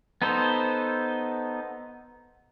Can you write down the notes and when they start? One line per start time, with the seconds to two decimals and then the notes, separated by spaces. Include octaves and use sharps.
0.22 B3 D#4 A4 C5